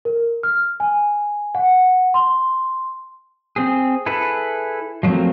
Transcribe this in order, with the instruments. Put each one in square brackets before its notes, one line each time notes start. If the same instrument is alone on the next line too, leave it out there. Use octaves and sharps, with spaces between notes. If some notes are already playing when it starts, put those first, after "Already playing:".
[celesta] A#4
F6
G#5
F#5
C6
[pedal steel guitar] C4 G#4
E4 G#4 A4 B4
F3 F#3 A3 A#3 C4